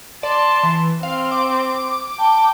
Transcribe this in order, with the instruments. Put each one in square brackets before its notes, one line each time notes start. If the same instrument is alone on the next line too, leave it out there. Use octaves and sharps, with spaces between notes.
[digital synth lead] D5 [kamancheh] A5 C6
[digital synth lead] E3
[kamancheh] C4 [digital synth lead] F5
[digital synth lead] D6
[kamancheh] G5 [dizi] A5